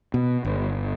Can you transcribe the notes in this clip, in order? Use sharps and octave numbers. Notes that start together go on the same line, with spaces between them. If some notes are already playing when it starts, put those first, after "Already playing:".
B2
G1